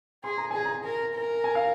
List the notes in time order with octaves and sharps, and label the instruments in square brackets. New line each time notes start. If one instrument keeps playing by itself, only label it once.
[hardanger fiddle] G#4 [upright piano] C6
[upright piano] A#5
[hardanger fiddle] G#4 [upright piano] G#5
[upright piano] A#5
[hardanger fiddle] A#4
A#4
[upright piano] G#5
F5